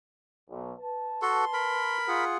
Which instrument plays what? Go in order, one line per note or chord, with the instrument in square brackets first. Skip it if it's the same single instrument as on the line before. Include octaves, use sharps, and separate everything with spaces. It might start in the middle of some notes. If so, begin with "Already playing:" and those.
[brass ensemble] B1
B4 A5
[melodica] F#4 A4 [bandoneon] C6
[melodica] A#4 B5
[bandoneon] F4 G#4 F#5